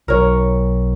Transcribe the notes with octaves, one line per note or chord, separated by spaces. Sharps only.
B1 F#3 A#4 C#5